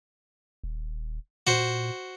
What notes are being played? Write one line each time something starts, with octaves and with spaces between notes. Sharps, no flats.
D#1
A#2 F#4 C5